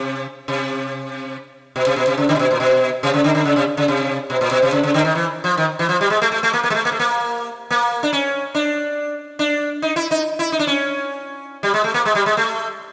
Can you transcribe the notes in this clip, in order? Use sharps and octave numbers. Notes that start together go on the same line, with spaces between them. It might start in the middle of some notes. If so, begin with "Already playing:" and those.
Already playing: C3
C3
B2
C3
B2
C3
C#3
D3
C3
B2
A#2
B2
C3
C#3
D3
D3
C#3
C3
C#3
C3
B2
A#2
B2
C3
C#3
C#3
D3
D#3
E3
F3
D#3
E3
F3
G3
G#3
A3
A3
A3
A#3
A#3
G#3
A3
A#3
A3
A#3
A#3
D4
C#4
D4
D4
D#4
E4
D#4
E4
D#4
D4
C#4
G3
G#3
A3
A#3
G#3
G3
G#3
A3